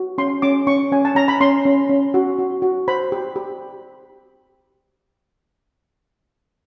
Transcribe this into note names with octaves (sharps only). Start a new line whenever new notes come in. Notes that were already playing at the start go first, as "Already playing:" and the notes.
Already playing: F#4
C#4 C6
C#4 D6
C#4 C#6
C#4 G#5
A5
C#4 A#5
B5
C#4 C6
C#4
C#4
F#4
F#4
F#4
C5 B5
G4
G4